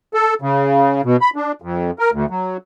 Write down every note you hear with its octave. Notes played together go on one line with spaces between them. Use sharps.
A4
C#3
B2
B5
D4
F2
A#4
D2
F#3